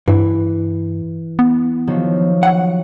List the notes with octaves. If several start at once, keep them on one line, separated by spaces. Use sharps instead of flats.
G2 E3
B3
D#3 F3 F#3
F#5